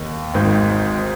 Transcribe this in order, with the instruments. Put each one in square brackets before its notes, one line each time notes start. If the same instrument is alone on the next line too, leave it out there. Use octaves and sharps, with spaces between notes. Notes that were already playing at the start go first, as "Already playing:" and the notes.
Already playing: [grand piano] D#2 D#3
G#1 G#2 D#3